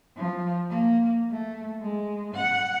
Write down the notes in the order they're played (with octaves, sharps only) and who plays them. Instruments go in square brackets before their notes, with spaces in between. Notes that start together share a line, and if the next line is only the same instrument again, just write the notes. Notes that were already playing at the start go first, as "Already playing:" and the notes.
[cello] F3
A#3
A3
G#3
F#5